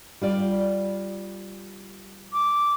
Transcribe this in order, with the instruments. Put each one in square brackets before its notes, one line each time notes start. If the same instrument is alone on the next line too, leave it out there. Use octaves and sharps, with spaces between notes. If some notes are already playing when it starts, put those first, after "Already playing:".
[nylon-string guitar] G3 F4 D5
[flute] D6